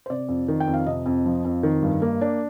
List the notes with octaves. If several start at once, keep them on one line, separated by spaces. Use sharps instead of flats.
C5
C3 D5
F2
D#3
G5
F2
F5
C3 D#5
F2
F3
F2
D#3
G2
A#3
D4